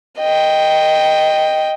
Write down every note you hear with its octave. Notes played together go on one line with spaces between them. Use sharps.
D#5 G5